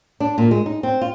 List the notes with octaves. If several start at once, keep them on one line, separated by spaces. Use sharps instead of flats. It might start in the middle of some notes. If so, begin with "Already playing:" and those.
D4
A#2
G#3
D#4
C4
F4